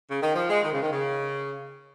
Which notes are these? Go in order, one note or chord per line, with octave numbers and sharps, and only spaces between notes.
C#3
D#3
F3
G#3
D#3
C#3
D#3
C#3